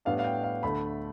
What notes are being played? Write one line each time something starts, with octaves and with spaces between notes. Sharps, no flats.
A2 G3 B3 D4 F5
F5
G5
F5
D2 D3 A3 B5